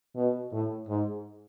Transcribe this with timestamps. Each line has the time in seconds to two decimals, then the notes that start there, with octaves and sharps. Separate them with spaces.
0.16 B2
0.52 A2
0.88 G#2